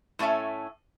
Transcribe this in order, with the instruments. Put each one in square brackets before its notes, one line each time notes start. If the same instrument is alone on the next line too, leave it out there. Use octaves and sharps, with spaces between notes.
[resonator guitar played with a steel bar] A2 A3 C#4 E5 A5